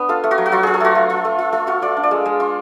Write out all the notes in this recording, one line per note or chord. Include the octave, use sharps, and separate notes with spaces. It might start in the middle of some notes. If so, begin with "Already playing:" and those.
Already playing: B3 D4
F4 A4
A3
F#4
F#3
F#4
F#3 F4
F4 G#4
A4
A3 F#4
A3
F4
A3
F4
A3 F4
F4 F#4
F4 D5
D4
D5
G#3
G#3
F4